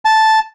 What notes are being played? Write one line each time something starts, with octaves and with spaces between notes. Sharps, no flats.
A5